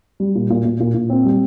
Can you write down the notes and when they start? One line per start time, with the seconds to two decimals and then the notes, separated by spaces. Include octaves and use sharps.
0.20 G3
0.35 A#2
0.50 A#2
0.65 A#2
0.80 A#2
0.94 A#2
1.10 C4
1.25 G3